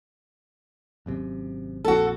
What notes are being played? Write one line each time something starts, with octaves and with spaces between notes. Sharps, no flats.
G#1 F#2 C3
A#1 F2 F#4 A4